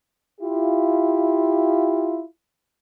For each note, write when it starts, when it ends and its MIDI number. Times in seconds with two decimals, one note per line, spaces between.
0.41 2.22 64
0.41 2.22 65
0.41 2.22 67